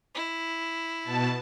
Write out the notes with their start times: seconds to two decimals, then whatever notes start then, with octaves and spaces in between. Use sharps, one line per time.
0.15 E4
1.04 B2 A5